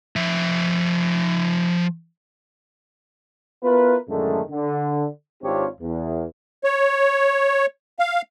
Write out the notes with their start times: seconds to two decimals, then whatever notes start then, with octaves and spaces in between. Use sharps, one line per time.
0.16 F3 E5
3.63 B3 E4 F4 A#4 B4
4.09 F#2 A2 D3 D#3 G#3 A3
4.50 D3
5.43 G#1 C4 D4 F4 G4 C#5
5.81 E2
6.64 C#5
7.99 F5